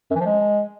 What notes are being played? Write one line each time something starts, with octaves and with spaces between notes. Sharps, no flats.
F#2
E3
F3
G#3